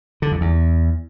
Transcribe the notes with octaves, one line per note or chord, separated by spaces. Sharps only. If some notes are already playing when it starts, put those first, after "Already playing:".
D3
F2
E2